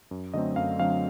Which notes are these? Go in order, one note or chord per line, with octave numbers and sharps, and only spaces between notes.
F#2
D3 F#3 A3 C4 D#5
F#2 F5
D3 F#3 A3 C4 F5